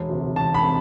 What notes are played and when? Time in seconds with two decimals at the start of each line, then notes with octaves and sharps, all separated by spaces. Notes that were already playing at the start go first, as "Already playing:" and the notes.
Already playing: E1
0.09 D2 C3
0.36 E1 A5
0.54 B5
0.63 C3